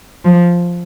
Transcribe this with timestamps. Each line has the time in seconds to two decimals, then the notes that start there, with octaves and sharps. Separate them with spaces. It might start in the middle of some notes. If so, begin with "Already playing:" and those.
0.25 F3